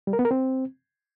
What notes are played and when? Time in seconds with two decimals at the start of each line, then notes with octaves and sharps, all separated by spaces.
0.07 G3
0.13 A#4
0.19 B3
0.25 A#4
0.31 C4